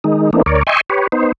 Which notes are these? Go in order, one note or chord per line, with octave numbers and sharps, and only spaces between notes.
D#3 G#3 D#4
E3 A3 A#3 C4 D4 D#4
D2 A#4 C#5 D5
D#5 E5 G5 G#5 C6 C#6
G4 B4 C#5
B3 D#4 C5